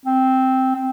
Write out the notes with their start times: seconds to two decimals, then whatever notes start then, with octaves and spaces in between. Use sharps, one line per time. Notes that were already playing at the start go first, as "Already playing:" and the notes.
0.06 C4
0.76 C4